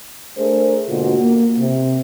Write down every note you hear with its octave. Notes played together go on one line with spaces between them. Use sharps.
A3 D4 G#4 A#4 C5
G#2 B2 D3 A#3 F4 F#4
A#3
C3